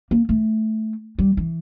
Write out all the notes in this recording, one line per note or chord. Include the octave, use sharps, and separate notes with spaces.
A#3
A3
G3
E3